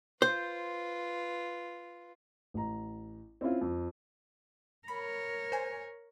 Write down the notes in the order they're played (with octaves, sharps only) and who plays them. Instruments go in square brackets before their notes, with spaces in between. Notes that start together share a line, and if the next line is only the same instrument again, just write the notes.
[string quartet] F4 B4 [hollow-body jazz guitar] C5
[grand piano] A1 A#5
C4 C#4 E4 F4
F2
[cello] A#4 C#5 [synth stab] B5
[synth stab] C5 G#5